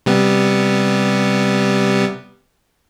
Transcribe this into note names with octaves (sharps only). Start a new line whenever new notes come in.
C3 G3 B3